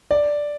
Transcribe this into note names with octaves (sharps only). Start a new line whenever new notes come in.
D5